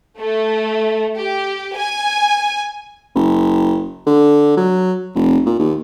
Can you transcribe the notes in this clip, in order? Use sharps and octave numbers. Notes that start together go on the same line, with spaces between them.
A3
G4
G#5
F#1
D3
F#3
F1
A#2
D#2